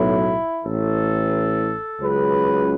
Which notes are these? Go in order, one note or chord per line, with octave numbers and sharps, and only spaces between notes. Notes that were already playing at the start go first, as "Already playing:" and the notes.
Already playing: B1 A2 F#3 E4
A1 A2 E3 A4
C#2 C#3 F#3 B4